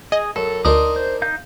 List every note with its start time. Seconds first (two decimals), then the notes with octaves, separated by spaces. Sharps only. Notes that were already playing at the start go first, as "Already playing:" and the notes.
0.12 G#4 D#5
0.36 F#2 A4
0.65 D2 D4 D#4 A#4 C6 D#6
0.96 C5
1.22 D#4 F5 G6